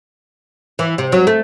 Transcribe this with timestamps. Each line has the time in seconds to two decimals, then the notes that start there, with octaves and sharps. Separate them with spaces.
0.79 E3
0.98 C3
1.12 F#3
1.27 A3